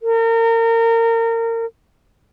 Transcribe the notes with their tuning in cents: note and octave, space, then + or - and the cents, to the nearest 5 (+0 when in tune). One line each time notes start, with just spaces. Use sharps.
A#4 -30